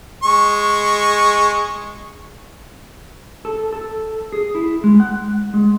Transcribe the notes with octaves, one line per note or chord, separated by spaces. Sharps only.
G#3 C#6
A4
A4
G#4
E4
G#3
F#5
G#3